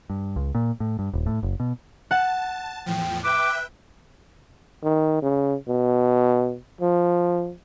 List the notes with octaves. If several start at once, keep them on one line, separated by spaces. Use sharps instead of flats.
G2
C#2
A#2
A2
G2
D#1
A2
F#1
B2
F#5 A5
E2 A2 F3 G5
B4 E5 G5 D6 F#6
D#3
C#3
B2
F3